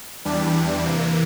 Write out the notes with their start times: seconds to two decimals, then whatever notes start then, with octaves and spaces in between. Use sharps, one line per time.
0.25 E2 E3 G3 D4
0.83 C3 E3 A#3